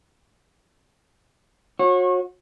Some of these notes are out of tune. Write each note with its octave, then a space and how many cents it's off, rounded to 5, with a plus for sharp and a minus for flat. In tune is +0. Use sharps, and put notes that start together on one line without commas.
F#4 -30 C#5 -35